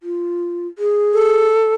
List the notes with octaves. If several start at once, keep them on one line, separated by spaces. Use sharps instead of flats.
F4
G#4
A4